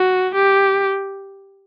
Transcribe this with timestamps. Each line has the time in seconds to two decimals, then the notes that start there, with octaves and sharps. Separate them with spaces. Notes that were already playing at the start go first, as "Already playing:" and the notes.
Already playing: F#4
0.35 G4